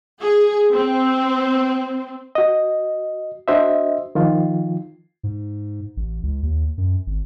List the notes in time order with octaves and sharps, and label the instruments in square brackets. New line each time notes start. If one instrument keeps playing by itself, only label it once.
[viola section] G#4
C4
[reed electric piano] F#4 D#5
D4 F#4 C5 D#5 E5
D#3 F3 F4
[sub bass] G#2
A1
C#2
D#2
F#2
G#1